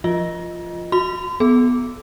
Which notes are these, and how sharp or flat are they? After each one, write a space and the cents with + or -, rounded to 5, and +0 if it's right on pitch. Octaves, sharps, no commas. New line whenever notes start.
F3 -20 F4 +0 D#5 +0
F#4 -30 C6 -40
B3 +0 A4 -45